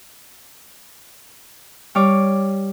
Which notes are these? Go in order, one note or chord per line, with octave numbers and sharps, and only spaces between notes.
G3 C#5 F5 D6